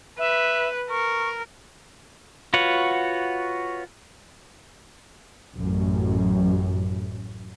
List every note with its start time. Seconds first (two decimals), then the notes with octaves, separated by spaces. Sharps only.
0.19 B4 E5
0.90 A#4 C#6
2.54 F4 F#4 B4 C#5 F#5
5.57 A1 F#2